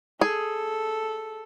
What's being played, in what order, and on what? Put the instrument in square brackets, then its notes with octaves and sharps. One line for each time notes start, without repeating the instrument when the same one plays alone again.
[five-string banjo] G#4 [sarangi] A4